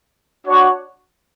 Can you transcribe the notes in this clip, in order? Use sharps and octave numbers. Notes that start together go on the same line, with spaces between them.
D4 F#4 C#5 F#5